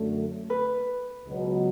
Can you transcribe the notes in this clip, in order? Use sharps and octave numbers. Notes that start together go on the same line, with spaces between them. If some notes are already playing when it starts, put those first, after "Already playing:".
Already playing: F#2 D3 F#3 A3
B4
C#2 B2 F#3